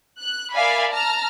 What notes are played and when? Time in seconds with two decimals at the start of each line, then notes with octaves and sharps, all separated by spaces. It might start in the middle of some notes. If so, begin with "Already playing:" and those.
0.19 F#6
0.52 A#4 D5 E5 F5 G#5 B5
0.91 A5 A#5 F6